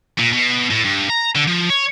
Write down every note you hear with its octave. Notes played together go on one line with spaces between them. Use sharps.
A#2
B2
A2
G2
A#5
D3
F3
C#5